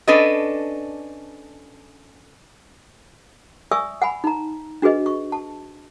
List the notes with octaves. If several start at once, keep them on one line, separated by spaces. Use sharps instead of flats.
C#4 D4 A4 B4 D5 D#5
D5 E5 G#5 C#6 D#6 E6
F#5 G#5 B5
D#4 A#5
D4 F#4 G#4 B4 D#5
C#6
A5